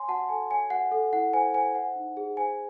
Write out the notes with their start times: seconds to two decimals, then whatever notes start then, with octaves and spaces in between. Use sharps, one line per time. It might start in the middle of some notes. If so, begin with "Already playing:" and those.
Already playing: C#5 G#5 C6
0.08 F#4 F#5 A5
0.29 A4 G#5
0.51 C#5 G#5
0.70 F#4 F#5
0.91 A4 F#5
1.13 E4 F#5
1.33 C5 G#5
1.54 C5 G#5
1.75 C5 F#5
1.96 D#4
2.17 G#4
2.37 C5 G#5